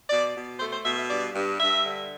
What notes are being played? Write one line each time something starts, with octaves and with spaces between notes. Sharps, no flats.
B2 D5
B2
A3 C5
C5
B2 E5
E5
G2 D5
G2
G2 E5
D3